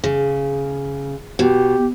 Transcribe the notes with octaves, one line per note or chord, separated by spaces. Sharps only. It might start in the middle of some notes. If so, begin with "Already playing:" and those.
C#3
B2 G4